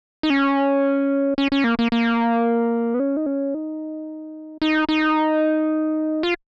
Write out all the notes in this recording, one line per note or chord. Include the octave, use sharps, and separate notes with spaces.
D#4
C#4
C#4
C#4
A#3
A#3
A#3
B3
C#4
D#4
C#4
D#4
D#4
D#4
F4